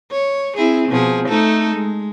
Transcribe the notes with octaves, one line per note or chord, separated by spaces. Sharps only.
C#5
C4 E4 G#4
B2 F3 G#4
A3 D#4 A4
G#3